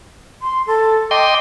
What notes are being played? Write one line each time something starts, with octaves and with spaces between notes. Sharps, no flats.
C6
A4
D#5 G5 C6 D6